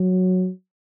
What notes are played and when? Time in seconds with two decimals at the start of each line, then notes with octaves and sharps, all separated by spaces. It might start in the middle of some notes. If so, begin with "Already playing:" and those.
Already playing: F#3